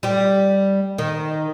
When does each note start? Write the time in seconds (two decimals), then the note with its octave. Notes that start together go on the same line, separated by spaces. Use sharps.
0.03 G3 G4
0.98 D#3